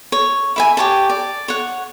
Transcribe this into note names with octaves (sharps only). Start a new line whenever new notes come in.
C#5
E4 E5 G#5
G4 C#5 A5
D5
C#5 F#5